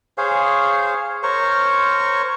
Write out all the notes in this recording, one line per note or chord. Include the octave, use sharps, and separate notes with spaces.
G#4 C5 C#5 F5
A#4 C5 C#5 C#6